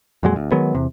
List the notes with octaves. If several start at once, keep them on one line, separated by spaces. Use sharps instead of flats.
F2 A#2 F#3 G#3
D2
D#3 F#3 G#3 B3
E2 C3